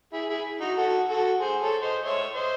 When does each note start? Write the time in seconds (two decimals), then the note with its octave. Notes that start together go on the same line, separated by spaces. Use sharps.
0.13 E4 G#4
0.29 E4 G#4
0.61 D#4 F#4
0.77 F#4 A4
1.09 F#4 A4
1.40 G#4 C5
1.61 A4 C#5
1.82 C5 D#5
2.04 C#5 E5
2.35 C5 D#5